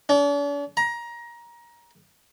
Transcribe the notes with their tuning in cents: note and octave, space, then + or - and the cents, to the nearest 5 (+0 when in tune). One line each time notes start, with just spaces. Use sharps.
D4 -45
A#5 +20